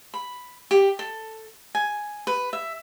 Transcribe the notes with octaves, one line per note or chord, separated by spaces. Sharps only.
B5
G4
A4
G#5
B4
E5